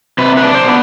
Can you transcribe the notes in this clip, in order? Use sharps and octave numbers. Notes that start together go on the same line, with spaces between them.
C3 B4
B4
D4
C5
B3